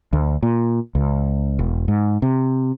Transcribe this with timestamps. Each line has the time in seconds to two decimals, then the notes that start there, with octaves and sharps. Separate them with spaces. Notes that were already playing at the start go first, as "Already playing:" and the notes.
0.13 D2
0.43 A#2
0.95 C#2
1.59 E1
1.88 G#2
2.22 C3